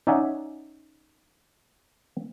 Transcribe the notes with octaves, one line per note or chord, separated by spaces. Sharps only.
C#4 D#4 D5 E5 F#5 G#5